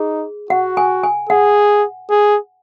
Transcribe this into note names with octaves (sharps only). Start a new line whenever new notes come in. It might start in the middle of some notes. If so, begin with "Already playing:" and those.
Already playing: D#4 G#4
F#4 F#5
G#5
G#5
G#4 F#5
G#4